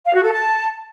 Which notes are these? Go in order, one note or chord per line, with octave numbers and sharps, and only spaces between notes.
F5
F#4
A4
A5